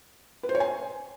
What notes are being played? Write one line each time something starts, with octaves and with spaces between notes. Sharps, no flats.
B4
C5
C#5
G#5